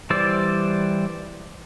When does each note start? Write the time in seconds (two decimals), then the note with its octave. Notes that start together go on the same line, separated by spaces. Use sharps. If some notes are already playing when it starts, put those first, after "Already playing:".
0.10 E3 G3 C5 D5 E6